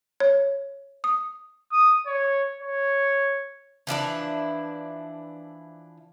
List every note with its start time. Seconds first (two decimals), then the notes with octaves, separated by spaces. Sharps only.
0.20 C#5
1.04 D#6
1.72 D#6
2.06 C#5
2.61 C#5
3.87 E3 F3 D4 E4